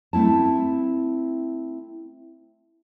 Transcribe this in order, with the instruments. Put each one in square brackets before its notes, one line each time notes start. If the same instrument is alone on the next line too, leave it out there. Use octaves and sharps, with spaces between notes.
[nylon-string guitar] A3 C4 E4 A5